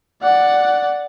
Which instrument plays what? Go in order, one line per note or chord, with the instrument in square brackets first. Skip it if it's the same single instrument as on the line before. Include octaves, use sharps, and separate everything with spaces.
[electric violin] D5 F#5